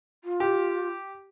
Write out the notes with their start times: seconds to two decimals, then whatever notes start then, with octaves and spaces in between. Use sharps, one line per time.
0.24 F4
0.40 G4